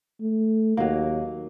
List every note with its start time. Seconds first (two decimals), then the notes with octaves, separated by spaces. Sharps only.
0.20 A3
0.77 D#2 F#3 A#3